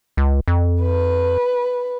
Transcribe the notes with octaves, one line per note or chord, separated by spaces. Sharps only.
C#2
F2
B4